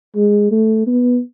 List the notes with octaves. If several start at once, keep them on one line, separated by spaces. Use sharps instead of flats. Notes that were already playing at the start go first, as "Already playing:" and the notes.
G#3
A3
B3